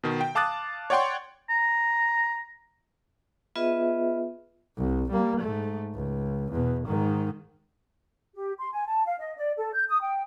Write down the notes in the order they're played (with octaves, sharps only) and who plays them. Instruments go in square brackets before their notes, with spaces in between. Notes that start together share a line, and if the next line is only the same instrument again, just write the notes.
[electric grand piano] B2 D#3
G5
F5 A5 D6 D#6 F#6 A6
C#5 D5 F#5 G5 C6 C#6
[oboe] A#5
[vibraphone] B3 F4 G#4 B4 D#5 E5
[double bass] C2
G3 A#3
G#2 A3
C#2
E2 B2
G#2 D#3
[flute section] G4
C6
G#5
A5
F5
D#5
D5
A4
G6
D#6
G5